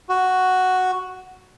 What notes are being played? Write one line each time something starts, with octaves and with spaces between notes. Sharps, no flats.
F#4